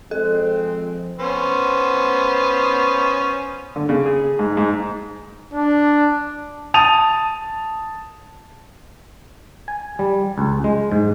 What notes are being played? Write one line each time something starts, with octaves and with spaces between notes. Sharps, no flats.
F3 G#3 C4 A4
B3 C#4 C5
D3
C#3
G#4
G#2
G#2
D4
A5 D#6 D#7 F7
G#5
G3
C#2
G#3
G#2